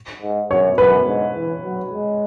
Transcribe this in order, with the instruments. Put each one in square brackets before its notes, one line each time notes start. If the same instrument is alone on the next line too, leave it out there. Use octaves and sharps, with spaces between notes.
[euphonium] G#2
[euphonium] F#2 [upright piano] C#5
[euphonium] F#2 [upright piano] B4
[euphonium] G#2
E3
F#3
G#3